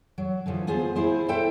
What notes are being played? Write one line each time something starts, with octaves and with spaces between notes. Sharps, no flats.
F#3
D3 E3 F3
B3 F4 G#4 C5
E4 G#4 C5
A4 C5 E5 G5